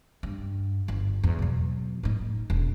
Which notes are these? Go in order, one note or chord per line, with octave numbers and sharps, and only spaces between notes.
G2
G1
E2
B2 F#3
A2 D#4
E1